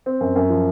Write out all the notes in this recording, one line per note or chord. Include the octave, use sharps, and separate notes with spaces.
C4
F#2
F#2
F3